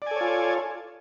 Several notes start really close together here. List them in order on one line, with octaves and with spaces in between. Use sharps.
D5 G#5 A4 C#5 F4